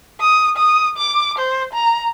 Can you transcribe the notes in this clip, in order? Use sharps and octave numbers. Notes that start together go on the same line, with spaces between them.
D#6
D#6
D6
C5
A#5